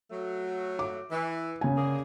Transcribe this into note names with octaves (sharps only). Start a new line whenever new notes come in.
F#3 A3
D6
E3
C#3 G#5
D3 A#3 G#4